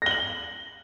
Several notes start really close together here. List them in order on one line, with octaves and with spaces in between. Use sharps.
A#6 G7 F#7